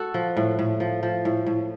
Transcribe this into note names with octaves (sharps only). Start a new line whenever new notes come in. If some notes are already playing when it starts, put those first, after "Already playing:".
Already playing: F#4 A4
F3
A2
A2
F3
F3
A2
A2